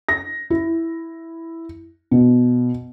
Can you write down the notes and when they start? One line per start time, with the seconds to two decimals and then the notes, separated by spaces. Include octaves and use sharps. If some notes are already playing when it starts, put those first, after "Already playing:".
0.09 A#6
0.50 E4
2.11 B2